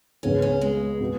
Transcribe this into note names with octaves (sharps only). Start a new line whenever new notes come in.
C#2 C#3 B3 C#4 G#4
C#4
G#3
B2 B3 F#4